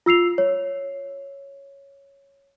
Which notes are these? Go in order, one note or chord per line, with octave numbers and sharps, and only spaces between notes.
F4 E6 C7 F7
C#5